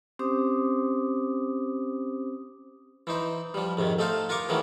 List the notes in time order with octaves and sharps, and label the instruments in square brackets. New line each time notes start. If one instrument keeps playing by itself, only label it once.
[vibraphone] C4 C#4 G4 C5 D6 D#6
[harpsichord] E3 D#4 C5
F3 G3
F2 G#2 C3 D#3
A3 D#4 A4 C5 F5
F4 A#4 F5 C#6 D6
D#3 E3 F#3 G#3 A3 C#4